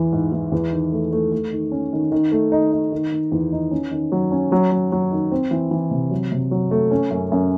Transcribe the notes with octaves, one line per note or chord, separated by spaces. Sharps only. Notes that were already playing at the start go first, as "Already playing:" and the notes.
Already playing: E2 E3 E4
G#2
E3
E2
D#3
A3
A3
A3
D#3
C#4
D#3
D#3
A3
D#4
D#4
D#3
D#3
E2
D#4
C#4
D#3
F#3
C#4
F#3
F#3
F#3
D#3
C4
E3
E3
C3
F#3
C3
F#3
A3
C#4
F#2
F#2